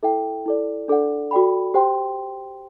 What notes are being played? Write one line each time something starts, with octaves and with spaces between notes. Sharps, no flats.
E4 A4 E5 G5
E4 A4 D5
D4 A4 D5 F#5
F#4 A4 D5 G5 B5
G4 C5 G5 C6